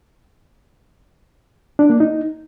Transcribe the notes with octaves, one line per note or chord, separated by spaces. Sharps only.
D4
A#3
D#4